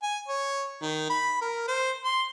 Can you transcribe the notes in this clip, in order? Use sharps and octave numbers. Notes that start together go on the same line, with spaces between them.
G#5
C#5
D#3
B5
A#4
C5
C6